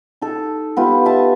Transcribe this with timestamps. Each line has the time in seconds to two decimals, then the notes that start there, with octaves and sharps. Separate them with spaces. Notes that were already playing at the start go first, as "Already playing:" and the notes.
0.21 D#4 A4
0.77 B3 F4 G4
1.05 E5 A5